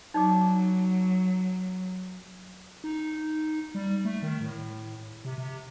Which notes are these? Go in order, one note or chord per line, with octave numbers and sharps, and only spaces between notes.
F#3 D#4 D5 D6
D#4
G3
A3
D#3
A2
C3
C3